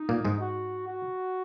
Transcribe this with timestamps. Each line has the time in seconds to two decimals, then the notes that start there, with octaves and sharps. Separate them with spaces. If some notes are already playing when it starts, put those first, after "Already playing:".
Already playing: D#4
0.09 A#2 A#3
0.25 G#2 G#3
0.40 F#4
0.88 F#4